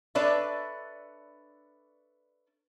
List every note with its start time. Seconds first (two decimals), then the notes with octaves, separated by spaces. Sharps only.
0.15 D4 A4 B4 C#5 D5 E5